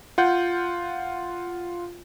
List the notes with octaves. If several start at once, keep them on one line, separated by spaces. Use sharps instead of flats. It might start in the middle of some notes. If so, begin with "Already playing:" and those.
F4 F#5 G6